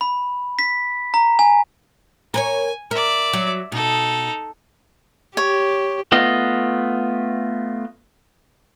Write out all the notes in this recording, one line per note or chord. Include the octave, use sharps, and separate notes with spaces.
B5
B6
A#5
G#5
A#4 B4 C#5 G#5
A#4 D5 E5
F#3
B2 D#4 A4
G4 C#5
A3 B3 F4 D#5